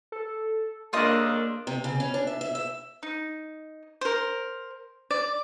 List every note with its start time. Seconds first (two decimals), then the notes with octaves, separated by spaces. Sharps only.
0.12 A4
0.93 F2 C#3 A#3 D4 F4 A#4 D#5 D#6
1.67 C3
1.84 C#3
2.00 C#4
2.14 D4
2.27 E5
2.41 E5
2.55 E5
3.03 D#4
4.01 A#4 C5
5.11 D5